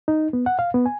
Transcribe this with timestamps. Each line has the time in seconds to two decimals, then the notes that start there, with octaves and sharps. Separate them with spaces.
0.08 D#4
0.33 B3
0.46 F#5
0.59 F5
0.74 B3
0.86 G#5